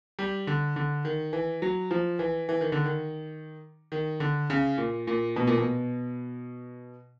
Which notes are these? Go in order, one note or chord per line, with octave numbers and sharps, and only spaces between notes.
G3
D3
D3
D#3
E3
F#3
F3
E3
E3
D#3
D3
D#3
D#3
D3
C#3
A#2
A#2
B2
A#2
B2